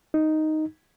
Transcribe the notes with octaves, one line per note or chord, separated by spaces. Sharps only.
D#4